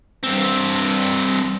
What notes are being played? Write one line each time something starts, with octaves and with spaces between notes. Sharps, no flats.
G2 C4